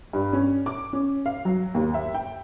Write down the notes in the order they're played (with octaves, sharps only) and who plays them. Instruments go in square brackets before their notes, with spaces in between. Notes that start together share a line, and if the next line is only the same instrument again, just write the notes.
[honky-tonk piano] G2
C#4
D6
C#4
F5
F#3
D#2
E5
G5